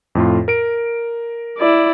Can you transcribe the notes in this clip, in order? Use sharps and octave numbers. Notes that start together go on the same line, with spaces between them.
F2 A2 F4
A#4 D7
E4 D5